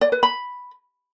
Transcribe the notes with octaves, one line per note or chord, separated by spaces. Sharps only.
D5
B4
B5